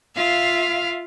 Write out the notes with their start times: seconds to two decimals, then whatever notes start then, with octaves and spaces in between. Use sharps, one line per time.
0.16 F4 E5 F5